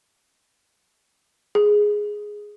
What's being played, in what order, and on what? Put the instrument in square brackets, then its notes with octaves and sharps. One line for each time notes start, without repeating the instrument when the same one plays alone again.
[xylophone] G#4